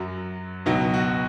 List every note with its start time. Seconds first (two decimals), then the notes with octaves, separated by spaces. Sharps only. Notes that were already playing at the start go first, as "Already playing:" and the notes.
Already playing: F#2 F#3
0.66 C#2 B2 F#3 D#4
0.94 F#4